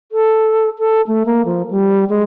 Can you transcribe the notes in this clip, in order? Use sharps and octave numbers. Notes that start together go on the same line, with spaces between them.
A4
A4
A3
A#3
F3
G3
G#3